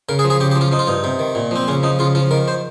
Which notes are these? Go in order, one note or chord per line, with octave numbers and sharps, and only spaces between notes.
C#3 A#4
G#4
F3
G#4
C#3 G4
G4
F3
F4
F3 D#4
F4
G2 D#4
C3
D#3
A#2
F3 C4
C#3 C#4
F3 D#4
C#3 F4
F3 F4
D#3 A#4
C5